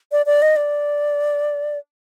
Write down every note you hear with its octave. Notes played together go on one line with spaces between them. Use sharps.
D5
D5
D#5
D5